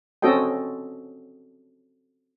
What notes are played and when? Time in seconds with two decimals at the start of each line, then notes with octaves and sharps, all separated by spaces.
0.22 C4 C#4 F#4 A4 D#5 G5